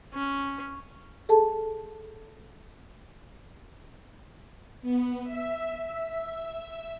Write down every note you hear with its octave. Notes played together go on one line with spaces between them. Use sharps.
C#4
G#4 A4 A5
B3
E5